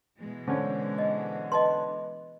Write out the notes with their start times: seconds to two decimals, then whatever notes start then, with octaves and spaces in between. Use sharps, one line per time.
0.17 B2 E3 G#3
0.48 D3 C#4 A4 C5
0.98 D#5
1.52 B4 D#5 A5 C6